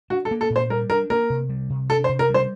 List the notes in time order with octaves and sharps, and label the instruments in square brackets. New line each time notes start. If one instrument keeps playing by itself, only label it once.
[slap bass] D4 [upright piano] F#4
[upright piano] A4
[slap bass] A#3
[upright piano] A4
[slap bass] A#2
[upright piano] C5
[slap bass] G3 [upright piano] A#4
[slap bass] D4 [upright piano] A#4
[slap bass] A#3 [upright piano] A#4
[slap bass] C3
G3
C3
[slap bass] D4 [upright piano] A4
[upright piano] C5
[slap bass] C3
[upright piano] A#4
[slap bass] G3 [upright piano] C5